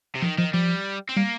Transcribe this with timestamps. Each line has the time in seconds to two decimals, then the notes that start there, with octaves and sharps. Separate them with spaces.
0.15 C3
0.22 D#3 F3
0.38 D#3 F3
0.53 F3 G3
1.09 C4
1.17 G3 A#3